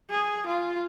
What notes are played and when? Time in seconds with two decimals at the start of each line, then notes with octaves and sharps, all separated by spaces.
0.10 G#4
0.47 F4